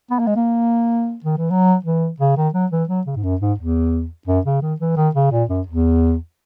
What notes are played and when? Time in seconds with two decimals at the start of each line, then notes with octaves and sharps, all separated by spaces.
0.11 B3
0.19 A#3
0.27 G#3
0.36 A#3
1.24 D#3
1.37 E3
1.51 F#3
1.85 E3
2.20 C#3
2.37 D#3
2.54 F#3
2.71 E3
2.89 F#3
3.07 C#3
3.16 G#2
3.23 F#2
3.41 G#2
3.59 E2
4.27 F#2
4.46 C#3
4.62 D#3
4.80 E3
4.97 D#3
5.15 C#3
5.32 A#2
5.49 F#2
5.67 E2